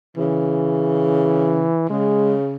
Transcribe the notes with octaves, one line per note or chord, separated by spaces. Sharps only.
C#3 E3
C#3 G#3